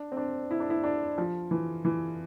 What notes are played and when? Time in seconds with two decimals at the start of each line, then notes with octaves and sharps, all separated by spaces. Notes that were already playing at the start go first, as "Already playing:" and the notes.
Already playing: D4
0.12 C4
0.17 D4
0.51 E4
0.60 D4
0.70 E4
0.84 D4
1.18 F3
1.51 E3
1.85 E3